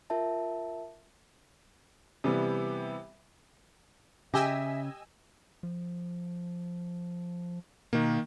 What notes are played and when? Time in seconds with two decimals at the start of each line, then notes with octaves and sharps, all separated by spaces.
0.10 F4 A#4 E5 A5
2.24 C3 E3 G3 B3
4.34 C#3 G4 D#5 E5 G#5 E6
5.63 F3
7.93 B2 D#3 A#3